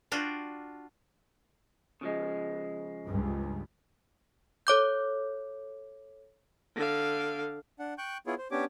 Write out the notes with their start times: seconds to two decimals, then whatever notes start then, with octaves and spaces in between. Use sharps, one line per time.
0.12 D4 F4 F#4 G5
2.01 C#3 F3 G#3
3.08 C#2 G2
4.67 A4 C#5 D6 G6
6.75 D3 F5
7.79 D4 F#5
7.98 G5 C#6 F#6 G6
8.27 B3 E4 F4 G#4 C#5
8.38 C5
8.51 B3 C#4 D4 G4 C#5 D6